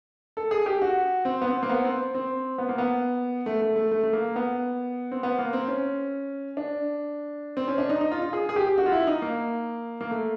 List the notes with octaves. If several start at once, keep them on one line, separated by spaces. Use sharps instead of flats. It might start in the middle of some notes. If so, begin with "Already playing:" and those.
A4
G#4
G4
F#4
C4
B3
C4
A#3
B3
C4
C4
B3
A#3
B3
A3
A3
A3
A3
A3
A#3
B3
C4
B3
A#3
C4
C#4
D4
C4
C#4
D4
D#4
D#4
F4
F4
G#4
G#4
G4
F#4
F4
E4
D#4
A#3
A#3
A3